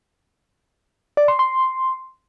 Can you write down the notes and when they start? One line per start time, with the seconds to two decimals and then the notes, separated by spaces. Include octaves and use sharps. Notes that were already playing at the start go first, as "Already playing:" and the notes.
1.17 D5
1.28 C6
1.39 C6